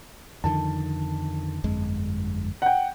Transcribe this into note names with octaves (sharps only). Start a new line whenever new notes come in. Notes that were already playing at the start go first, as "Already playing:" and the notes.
F2 D3 D#3 A5
G1 F2 G#3
F#5 G5